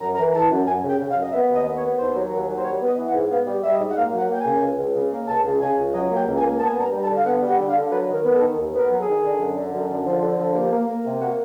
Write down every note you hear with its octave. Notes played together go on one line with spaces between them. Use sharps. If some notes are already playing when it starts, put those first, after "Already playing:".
F#2 A#5
E3 A#5
E3 A5
F#2
F#2 G#5
C#3
G5
C#3
F5
F#2
D#5
B3 E5
D#2
D#5
B3
C#5
B3
D#2 C5
F#3
D#2
F#3
C5
G3 C#5
B3
D#5
E3
F#5
G#2
B3 F5
G3
G3 E5
D#5
G#2
F#5
A#3 F5
F#3
F#5
A#3 G5
G#5
C#3
C#2
C#2
C#3
A#3
C#2 A5
C#3
C#3 G#5
C#2
F#3 D#5
A#3
G5
C#2
G#5
A#3
B3 A5
G#5
G2 A5
A#5
G3
A5
D3
F5
B3 F#5
G3
F#5
D3
F5
D3
F#3 B4
D#3
A#4
B3
A4
D#3
D#2
B3
A#4
F#3
A4
G#4
D#3
D3
F#2
D3
F#2
D3
F3
D3
F3
A#3 G4
A#3
A#3
C3
A#3 F#4